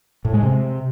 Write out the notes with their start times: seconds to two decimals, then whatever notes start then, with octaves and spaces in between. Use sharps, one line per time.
0.25 A2
0.34 G#3
0.43 C3